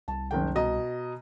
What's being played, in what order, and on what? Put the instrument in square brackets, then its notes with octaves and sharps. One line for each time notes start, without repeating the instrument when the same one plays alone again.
[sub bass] C2 [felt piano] A5
[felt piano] F#1 D#3 G5
B2 D#5 A#5